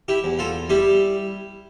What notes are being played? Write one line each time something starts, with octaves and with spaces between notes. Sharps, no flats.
E4 G4
E2
F4 A4
G3 E4 G4